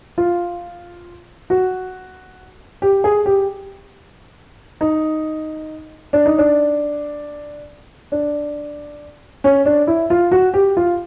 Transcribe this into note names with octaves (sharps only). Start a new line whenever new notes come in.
F4
F#4
G4
G#4
G4
D#4
D4
D#4
D4
D4
C#4
D4
E4
F4
F#4
G4
F4